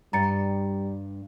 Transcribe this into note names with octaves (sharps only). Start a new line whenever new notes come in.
G2 G3 A#5 A6 C#7